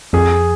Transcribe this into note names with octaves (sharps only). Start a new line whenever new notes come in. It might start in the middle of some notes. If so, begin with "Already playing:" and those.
F2 G#4